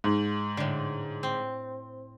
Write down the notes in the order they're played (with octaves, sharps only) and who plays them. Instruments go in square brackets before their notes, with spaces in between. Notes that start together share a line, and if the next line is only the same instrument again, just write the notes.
[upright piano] G#2
[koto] A2 D3
C4